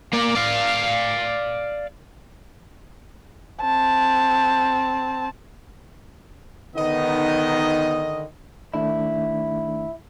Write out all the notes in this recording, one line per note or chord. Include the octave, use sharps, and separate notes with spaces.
A#3 D5
D5 F5
C4 A5
D3 D#3 B3 D#4 D#5
D#3 A3 D4 E4